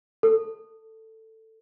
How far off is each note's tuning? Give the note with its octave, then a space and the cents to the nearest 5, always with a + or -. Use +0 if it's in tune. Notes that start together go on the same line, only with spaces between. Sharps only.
A4 +15